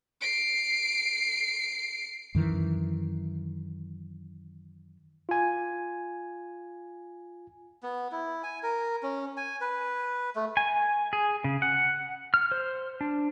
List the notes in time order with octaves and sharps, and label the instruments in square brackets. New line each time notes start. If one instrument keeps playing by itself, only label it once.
[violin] C7 D7
[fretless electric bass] F#2 D#3 E3
[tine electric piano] F4 G#5
[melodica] B3
E4
G#5
A#4
C#4
G#5
B4
A3
[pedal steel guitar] G#5
G#4
C#3
F#5
F6
C5
D4